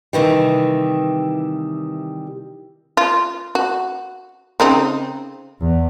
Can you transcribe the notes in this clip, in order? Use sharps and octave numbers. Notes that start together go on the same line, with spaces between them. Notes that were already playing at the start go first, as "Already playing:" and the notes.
C3 D#3 E3 G3
F4
F#4
C#3 C4 D#4
E2